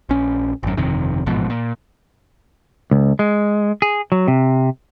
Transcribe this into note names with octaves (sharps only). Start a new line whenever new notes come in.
A#1 C#4
G#1 F#2
G1 F2 C3 D#3
A1 G#2 B2 F3
A#2
C#2
G#3
G#4
F#3
C3